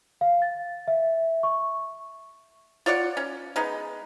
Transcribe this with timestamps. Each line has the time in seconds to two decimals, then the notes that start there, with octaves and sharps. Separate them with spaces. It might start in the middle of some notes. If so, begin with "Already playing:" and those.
0.21 F5
0.42 A6
0.88 E5
1.43 C#6
2.86 F4 C#5 D5 F#5
3.17 C#4
3.56 G#3 B3 D#4